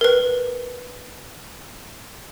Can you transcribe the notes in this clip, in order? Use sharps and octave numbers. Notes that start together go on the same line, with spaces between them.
A#4 B4